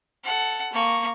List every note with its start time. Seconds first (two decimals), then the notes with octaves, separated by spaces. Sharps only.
0.24 A4 F#5
0.73 A#3 C#6